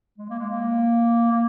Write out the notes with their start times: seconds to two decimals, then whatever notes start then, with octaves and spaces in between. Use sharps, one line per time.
0.18 G#3
0.30 A#3
0.39 G#3
0.50 A#3
1.32 A#3